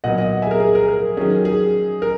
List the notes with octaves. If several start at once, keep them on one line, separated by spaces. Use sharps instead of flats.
A#2 F#3 B3 D#5 F#5
D#5 F#5
E5 G#5
G#4
A#4
G#4
A#4
A#4
D#3 F#3 C#4 G#4
G#4
A#4